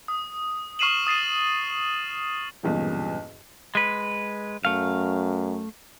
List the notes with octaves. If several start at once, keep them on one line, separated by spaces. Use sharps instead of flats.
D#6
C#6 F6 C7 D#7 E7 F#7
D#6 A6 C7 D#7
B1 E2 G2 A#2 C#3
G#3 B4
F#2 A3 F5